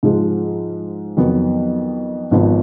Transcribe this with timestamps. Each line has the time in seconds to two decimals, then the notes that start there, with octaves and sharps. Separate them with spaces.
0.03 G#2 F3 G#3
1.17 F2 D#3 F#3 B3
2.31 G#1 G#2 F3 B3